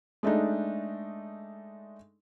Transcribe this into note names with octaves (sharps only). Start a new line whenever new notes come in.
G#3 A3 D4 D#4